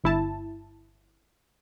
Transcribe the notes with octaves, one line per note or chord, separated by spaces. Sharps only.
G1 E4 A5